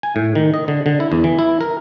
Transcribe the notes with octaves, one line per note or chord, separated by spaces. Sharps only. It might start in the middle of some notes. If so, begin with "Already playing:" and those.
G#5
A2
D#3
D#5
D3
D3
E4
E2
E3
E4
A#4